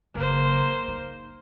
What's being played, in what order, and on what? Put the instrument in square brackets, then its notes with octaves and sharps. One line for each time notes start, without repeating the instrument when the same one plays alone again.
[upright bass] F#1 D#3 [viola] A#3 C5
[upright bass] D#4